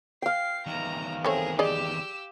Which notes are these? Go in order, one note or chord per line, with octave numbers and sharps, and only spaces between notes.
F5 G5 C7
E2 D#3 A#5
A3 C4 G#4 A#4 C#5
G4 G#4 D5 D#5 E6